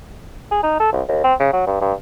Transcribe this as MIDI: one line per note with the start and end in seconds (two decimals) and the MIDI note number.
0.51 0.60 68
0.63 0.78 63
0.80 0.90 69
0.93 1.02 36
1.08 1.22 39
1.24 1.34 60
1.40 1.50 49
1.53 1.62 54
1.67 1.78 43
1.81 1.93 43